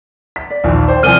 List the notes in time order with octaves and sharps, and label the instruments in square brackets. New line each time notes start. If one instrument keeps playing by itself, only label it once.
[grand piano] B6
[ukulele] D5
[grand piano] A#1 D#2 A#2
[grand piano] C5 [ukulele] D5 G5
[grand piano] C3 F3 [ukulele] A#4 D5 G#5 [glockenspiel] F6 D#7 G7